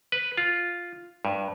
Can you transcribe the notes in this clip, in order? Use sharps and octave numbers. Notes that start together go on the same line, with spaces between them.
B4
F4
G2